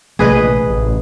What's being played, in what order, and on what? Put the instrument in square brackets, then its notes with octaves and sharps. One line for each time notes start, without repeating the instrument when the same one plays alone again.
[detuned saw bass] A#1 [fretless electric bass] C3 E3 A3 [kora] G#4 B4 D#5
[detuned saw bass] A1